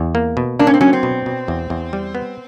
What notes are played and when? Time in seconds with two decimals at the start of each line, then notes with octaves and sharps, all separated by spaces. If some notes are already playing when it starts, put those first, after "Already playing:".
Already playing: E2
0.15 A#3
0.37 B2
0.59 A#3 D4
0.67 C#4
0.74 C4
0.81 F#3 C#4
0.93 C4
1.03 B2
1.26 B2
1.48 E2
1.70 E2
1.93 G3
2.15 B3